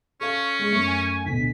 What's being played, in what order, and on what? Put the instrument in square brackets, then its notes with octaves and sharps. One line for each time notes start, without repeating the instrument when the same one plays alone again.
[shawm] C#4 [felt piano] A4 F5 [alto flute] C#6
[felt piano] G#3 G#4
[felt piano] F#2 A3 [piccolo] C#7
[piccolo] G#5
[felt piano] D2 B2 D3 [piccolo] B6